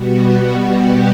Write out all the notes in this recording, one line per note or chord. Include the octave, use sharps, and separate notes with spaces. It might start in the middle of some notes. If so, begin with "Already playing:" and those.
Already playing: B2 G3 B3 F#4
G4